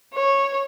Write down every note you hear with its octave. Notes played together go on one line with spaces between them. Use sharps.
C#5